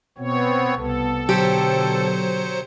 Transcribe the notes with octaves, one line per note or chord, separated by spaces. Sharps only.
B2 B3 C4 C#5
C2 B3 A4
B2 D3 F#3 G4 C5 C#7